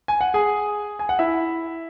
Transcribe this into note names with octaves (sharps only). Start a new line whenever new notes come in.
G#5
F#5
G#4 G#5
G#5
F#5
E4 E5